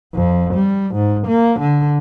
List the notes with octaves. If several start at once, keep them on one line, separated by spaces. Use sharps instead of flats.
F2
G3
G#2
A#3
D3